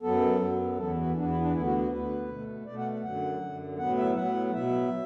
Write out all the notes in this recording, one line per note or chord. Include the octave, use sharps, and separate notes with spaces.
F#2 F#3 B3 A4
F#2 F#3 B3
E2 E3 B3 A4
F#4
E2 E3 B3 D4
E4
D4
D2 D3 B3 E4
F#4
F#4
D2 D3 B3 B4
B2 A3
B2 A3 D5
F#5
F#2 D3 F#3 F#5
F#2 D3 F#3
A2 F#3 B3 F#5
E5
A2 F#3 B3 F#5
B2 F#3 B3 E5